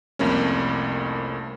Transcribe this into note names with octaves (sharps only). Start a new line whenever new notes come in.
C2 F2 A3 A#3 C#4